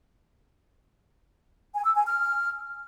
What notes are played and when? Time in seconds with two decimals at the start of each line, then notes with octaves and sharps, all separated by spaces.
1.73 G#5
1.84 E6
1.95 G#5
2.06 F6